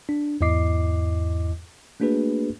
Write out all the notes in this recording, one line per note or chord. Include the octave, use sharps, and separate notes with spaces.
D4
E2 G#2 E4 D#5 D6 C7
A3 A#3 D4 F#4 G#4 B4